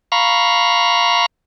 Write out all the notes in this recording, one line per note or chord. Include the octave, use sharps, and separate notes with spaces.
F5 A#5 B5 C#6